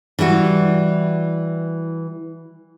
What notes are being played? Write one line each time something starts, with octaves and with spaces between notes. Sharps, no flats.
E3 G3 E4 F#4